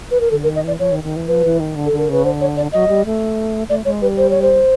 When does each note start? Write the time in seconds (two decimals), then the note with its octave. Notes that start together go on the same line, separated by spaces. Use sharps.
0.11 B4
0.21 A#4
0.31 D3 A4
0.43 A#4
0.47 D#3
0.55 D#5
0.64 E3 D5
0.79 F3 C#5
0.91 D#3
1.04 D#3
1.16 E3
1.28 F3 B4
1.45 E3
1.60 D#3
1.76 D3
1.86 A4
1.92 D3
1.98 A#4
2.09 C#3 B4
2.24 D3 C5
2.41 C#5
2.57 D5
2.73 F#3 D#5
2.88 G3
3.05 A3
3.69 A3 D5
3.85 G#3 C#5
4.02 G3 B4
4.17 C5
4.30 C#5
4.42 C5